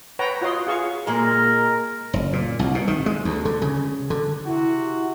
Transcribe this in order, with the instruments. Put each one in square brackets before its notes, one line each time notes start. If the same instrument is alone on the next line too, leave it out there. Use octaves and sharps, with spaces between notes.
[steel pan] B4 C#5 F#5 G5 A#5
F4 F#4 C#5 D#5 C6
F4 G#4 F5 C#6
[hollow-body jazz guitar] A#2 G#3 [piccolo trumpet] A#4
[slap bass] F#1
A#2
C2
B2
D#3
G#3
D2
D3
C#3
D3
[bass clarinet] C3 [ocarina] E4 [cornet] F#4